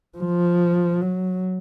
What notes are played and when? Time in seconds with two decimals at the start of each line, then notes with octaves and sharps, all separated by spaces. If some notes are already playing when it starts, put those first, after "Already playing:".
0.18 F3
1.02 F#3